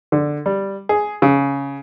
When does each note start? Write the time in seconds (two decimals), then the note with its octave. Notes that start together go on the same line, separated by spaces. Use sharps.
0.12 D3
0.46 G3
0.89 G#4
1.22 C#3